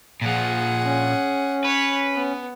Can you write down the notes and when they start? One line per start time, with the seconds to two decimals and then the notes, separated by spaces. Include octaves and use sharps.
0.22 A#2 F3 G#4 F#5
0.84 C#4
1.65 B4 C#5
2.14 B3